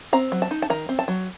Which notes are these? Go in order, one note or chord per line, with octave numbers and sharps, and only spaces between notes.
C4 A#5
F#3
A5
D#4
A5
D#3 A#5
C4
A5
F#3